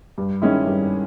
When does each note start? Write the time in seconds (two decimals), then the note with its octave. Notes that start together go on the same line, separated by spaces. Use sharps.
0.18 G2
0.42 D#3 G#3 C#4 E4
0.67 G2